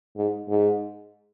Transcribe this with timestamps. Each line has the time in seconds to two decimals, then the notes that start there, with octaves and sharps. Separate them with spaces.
0.17 G#2
0.48 G#2